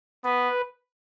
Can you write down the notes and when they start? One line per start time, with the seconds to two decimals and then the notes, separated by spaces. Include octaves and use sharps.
0.25 B3 B4